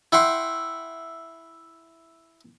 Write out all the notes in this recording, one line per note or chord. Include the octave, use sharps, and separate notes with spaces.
E4 F#5 G5 C6